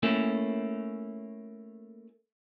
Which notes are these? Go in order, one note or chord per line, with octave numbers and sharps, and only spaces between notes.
A3 A#3 C#4 E4